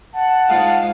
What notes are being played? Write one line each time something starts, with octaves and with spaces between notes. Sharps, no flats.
F#5 A5
G#2 G#3 F4 F5 A5